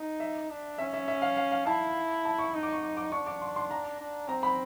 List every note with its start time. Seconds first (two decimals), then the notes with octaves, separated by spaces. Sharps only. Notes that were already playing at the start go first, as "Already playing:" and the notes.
Already playing: D#4
0.20 E5
0.50 D4
0.78 C#4 E5
0.93 E5
1.08 E5
1.22 F5
1.37 F5
1.52 F5
1.66 E4 A5
2.25 A5
2.39 C#6
2.54 D#4
2.63 D6
2.73 C#6
2.83 D6
2.97 D6
3.12 D4 C#6
3.26 D6
3.42 C6
3.56 C6
3.71 A#5
4.00 D4
4.28 C4 A#5
4.43 B5